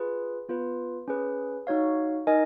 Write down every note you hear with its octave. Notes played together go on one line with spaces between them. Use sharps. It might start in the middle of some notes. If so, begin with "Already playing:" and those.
Already playing: F4 G#4 B4
B3 F4 B4
C#4 G#4 B4
D#4 F#4 C#5 F5
D#4 A#4 D#5 G#5